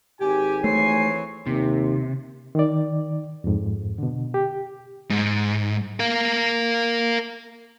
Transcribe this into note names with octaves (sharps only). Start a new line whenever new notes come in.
G#1 G4 G#5
E3 A3 C4 C#5 C7
D#2 C3
D#3 D5
F2 G#2
B2 D3
G4
G#2
A#4 F5